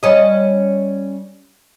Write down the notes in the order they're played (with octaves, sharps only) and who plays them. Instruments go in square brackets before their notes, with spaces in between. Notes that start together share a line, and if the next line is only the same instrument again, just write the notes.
[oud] G3 C#4 D#5